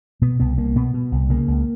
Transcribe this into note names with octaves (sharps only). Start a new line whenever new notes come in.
B2 B3
C2 B3
C2 A#3
B2 B3
B2
C2
C#3 A#3
C#2